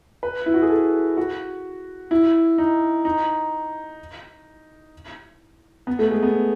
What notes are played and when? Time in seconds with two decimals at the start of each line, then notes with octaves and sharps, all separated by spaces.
0.23 B4
0.46 E4
0.54 F#4
0.62 G#4
0.70 A4
1.17 F#4
2.11 E4
2.58 D#4
3.05 D#4
5.87 B3
5.99 A3
6.11 G#3
6.23 B3